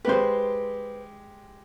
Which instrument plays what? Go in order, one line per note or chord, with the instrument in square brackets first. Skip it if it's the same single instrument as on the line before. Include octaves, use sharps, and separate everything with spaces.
[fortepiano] G#3 G4 [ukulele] B4 C5